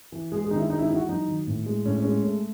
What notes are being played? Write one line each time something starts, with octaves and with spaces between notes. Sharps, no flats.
E3
G#3 G#4
G#4
D#3 D#4
E4
G#3 D#4
E4
D#4
E3 E4
F#4
F#3 D#4
D#3
A2
G#3
A2 C#4
G#3 C#4
A3